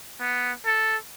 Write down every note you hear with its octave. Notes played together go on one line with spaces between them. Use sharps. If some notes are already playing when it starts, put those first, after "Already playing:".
B3
A4